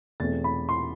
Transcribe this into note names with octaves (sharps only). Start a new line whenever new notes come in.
E2 B2 A3 C4 A6
B5
C6